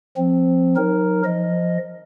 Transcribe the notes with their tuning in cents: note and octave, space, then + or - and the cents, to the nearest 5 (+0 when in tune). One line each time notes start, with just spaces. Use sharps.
F3 +0 C4 +0
F#3 -35 D#4 +0 A#4 +0
F3 -10 D#5 +0